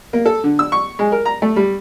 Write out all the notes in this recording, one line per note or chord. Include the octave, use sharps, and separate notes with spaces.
A#3
A4
D3
E6
C#6
G#3
A#4
A#5
A3
G3